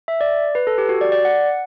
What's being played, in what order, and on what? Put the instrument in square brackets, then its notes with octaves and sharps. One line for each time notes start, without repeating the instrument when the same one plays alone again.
[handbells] E5
D5
B4
A4
G4
F#4
D5
D5
F#5